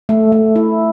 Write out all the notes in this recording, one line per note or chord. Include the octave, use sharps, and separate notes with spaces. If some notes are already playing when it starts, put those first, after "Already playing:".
A3
A3
E4